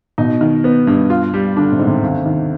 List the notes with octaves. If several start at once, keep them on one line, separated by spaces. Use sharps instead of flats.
B2 D#4
D#3
B3
G2
F4
G3
D3 D4
C3
G#2
C3
D#2
D#3